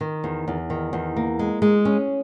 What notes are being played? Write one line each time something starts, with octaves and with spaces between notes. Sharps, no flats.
D#3
E2
E2
D#3
E2
A#3
G#3
G#3
C#4